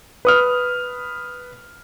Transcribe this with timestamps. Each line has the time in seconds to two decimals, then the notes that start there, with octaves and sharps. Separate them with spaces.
0.25 B4 D#6 F6